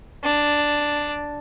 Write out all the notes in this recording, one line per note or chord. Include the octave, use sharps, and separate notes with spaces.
D4